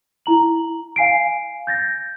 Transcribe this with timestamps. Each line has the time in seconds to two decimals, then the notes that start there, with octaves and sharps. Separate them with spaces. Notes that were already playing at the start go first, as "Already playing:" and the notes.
0.26 E4 A#5 F#7
0.96 F5 G#5 C7 D7
1.67 G6 A6 A#6